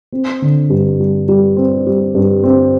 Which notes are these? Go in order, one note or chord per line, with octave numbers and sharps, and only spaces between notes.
C4
D3
G2
G3
G3
C4
G3
G2
C4